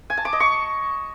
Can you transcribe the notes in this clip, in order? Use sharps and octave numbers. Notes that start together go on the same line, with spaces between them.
G#5
A5
D6
D#5
C#6